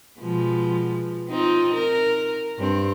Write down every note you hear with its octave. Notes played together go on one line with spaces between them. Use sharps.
B2 F3 G#3
C4 D#4 F4
A#4
G2 C4